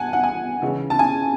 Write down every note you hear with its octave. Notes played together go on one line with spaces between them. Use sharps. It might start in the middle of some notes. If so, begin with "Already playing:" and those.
Already playing: F#5 G#5 A5
F#5
G#5
C#3 E3 G#3 C#4 E4
A5
G#5